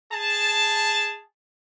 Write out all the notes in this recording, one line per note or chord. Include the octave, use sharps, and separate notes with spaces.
G#4 A5